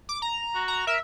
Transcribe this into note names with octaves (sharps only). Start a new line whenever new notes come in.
D6
A#5
F#4
A#5
A#4 E5